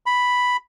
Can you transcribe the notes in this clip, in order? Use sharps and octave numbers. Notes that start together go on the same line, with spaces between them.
B5